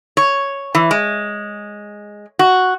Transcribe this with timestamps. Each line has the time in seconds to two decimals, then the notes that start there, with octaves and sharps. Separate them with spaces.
0.17 C#5
0.75 E3
0.91 G#3
2.39 F#4